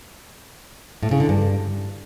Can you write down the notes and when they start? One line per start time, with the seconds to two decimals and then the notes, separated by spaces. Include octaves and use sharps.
1.03 A2
1.11 C#3
1.20 D3
1.29 G2